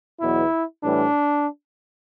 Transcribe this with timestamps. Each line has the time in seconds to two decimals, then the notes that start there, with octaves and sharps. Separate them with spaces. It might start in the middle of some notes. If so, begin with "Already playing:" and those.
0.21 E2 B2 F#3 E4
0.83 A2 E3 G3 D4